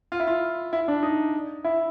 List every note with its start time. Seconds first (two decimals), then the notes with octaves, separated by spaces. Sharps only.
0.12 F4
0.20 E4
0.27 F4
0.73 E4
0.88 D4
1.03 D#4
1.64 E4